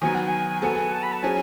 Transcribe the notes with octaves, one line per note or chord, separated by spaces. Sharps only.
D#3 F#3 B3 G#5
F#5
G#5
F#3 B3 F#4 A4 G#5
A5
B5
A5
F#3 C#4 G#4 G#5